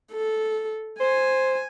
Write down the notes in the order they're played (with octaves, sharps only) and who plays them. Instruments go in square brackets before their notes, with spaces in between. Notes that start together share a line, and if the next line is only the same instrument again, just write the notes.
[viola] A4
[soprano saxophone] C5 [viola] G#5